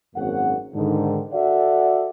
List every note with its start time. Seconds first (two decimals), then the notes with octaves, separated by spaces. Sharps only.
0.15 G#1 F#2 A#3 C#4 F#5
0.75 G#2 D3 D#3
1.33 F#4 A4 D5 E5 F#5